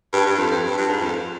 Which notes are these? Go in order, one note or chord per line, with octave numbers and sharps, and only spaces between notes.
G2
G2
F2
F2
G2
G2
G#2
F2